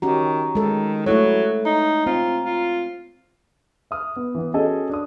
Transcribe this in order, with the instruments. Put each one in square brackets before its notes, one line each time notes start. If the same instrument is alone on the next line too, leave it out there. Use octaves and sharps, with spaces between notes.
[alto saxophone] D#3 [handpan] C#4 F#4 G4 [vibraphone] A#5
[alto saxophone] D#3 [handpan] G#3 A4
[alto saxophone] F#3 [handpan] A3 E4 C#5 [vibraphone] A4
[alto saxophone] D#4 [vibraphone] A#5
[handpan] C4 [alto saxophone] F4
[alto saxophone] F4
[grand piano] E5 D#6 F6
B3
E3 B3
C#4 F#4 G#4 A4 D#5
D4 D#6